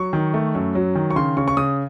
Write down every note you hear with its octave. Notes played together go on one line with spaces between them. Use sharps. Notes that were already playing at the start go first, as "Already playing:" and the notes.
Already playing: F#3 C#6
D#3
A3
F#2
F#3
D#3
C#6
C#3 C6
C#3 C#6
C#6
C#3 D#6